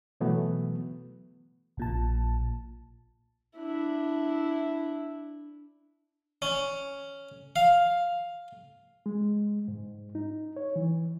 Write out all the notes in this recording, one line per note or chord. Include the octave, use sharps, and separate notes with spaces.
B2 E3 F#3 A3 B3
A#1 A#2 A5
D4 E4
C#4
F5
G#3
G#2
D#4
C#5
E3